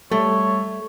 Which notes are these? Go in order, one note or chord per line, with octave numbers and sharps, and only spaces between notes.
G3 A3 C#5